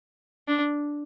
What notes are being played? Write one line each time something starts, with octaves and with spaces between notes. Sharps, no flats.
D4